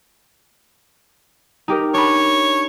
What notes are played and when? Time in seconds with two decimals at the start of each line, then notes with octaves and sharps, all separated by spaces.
1.68 D#4 G4 A#4
1.94 D4 C#5 B5